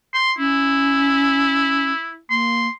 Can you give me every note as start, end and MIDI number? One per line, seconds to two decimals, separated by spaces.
0.14 0.33 84
0.38 1.92 61
0.38 2.19 64
2.30 2.68 58
2.30 2.70 84